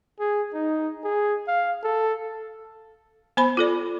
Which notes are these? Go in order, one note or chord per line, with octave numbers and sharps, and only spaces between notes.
G#4
D#4
G#4
F5
A4
B3 C5 B5
F4 A4 D5